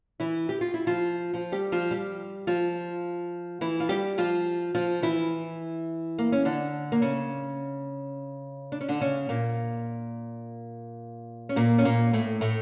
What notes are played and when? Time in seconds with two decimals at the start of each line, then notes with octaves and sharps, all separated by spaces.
0.20 E3 E4
0.49 G4
0.61 F4
0.74 E4
0.87 F3 F4
1.33 F3 F4
1.52 G3 G4
1.72 F3 F4
1.91 G3 G4
2.47 F3 F4
3.61 E3 E4
3.80 F4
3.89 G3 G4
4.18 F3 F4
4.75 F3 F4
5.02 E3 E4
6.18 A#3
6.32 C#4
6.45 D3 D4
6.92 A#3
7.02 C#3 C#4
8.72 D4
8.81 C#4
8.88 D3 D4
9.01 C#3 C#4
9.29 A#2 A#3
11.49 C#4
11.56 A#2 A#3
11.78 C#4
11.85 A#2 A#3
12.13 A2 A3
12.41 A2 A3